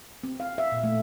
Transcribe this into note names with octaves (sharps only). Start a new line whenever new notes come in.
C4
F5
E5
A#2
A3